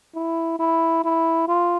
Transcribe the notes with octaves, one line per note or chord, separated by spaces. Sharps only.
E4
E4
E4
F4